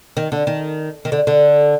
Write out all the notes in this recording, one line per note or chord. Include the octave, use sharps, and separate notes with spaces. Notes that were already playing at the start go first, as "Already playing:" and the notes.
D#3
D3
D#3
D#3
D3
D3